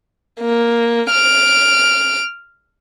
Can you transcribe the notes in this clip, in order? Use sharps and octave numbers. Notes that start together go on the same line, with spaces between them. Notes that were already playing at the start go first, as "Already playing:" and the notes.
A#3
F6 D7